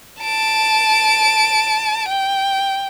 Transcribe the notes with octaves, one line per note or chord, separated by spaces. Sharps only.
A5 D7
G5